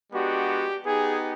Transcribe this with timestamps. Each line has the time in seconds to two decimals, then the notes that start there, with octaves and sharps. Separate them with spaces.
0.13 G#3 B3 D4 F#4 G4
0.85 B3 D#4 G4 G#4